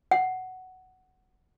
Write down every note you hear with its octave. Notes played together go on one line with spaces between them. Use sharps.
F#5